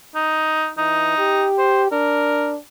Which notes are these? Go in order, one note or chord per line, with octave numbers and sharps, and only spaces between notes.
D#4
E3 D#4
G4
C5
D4 A#4